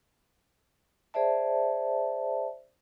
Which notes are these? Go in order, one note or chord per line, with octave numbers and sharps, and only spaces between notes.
G#4 C5 D5 E5 A5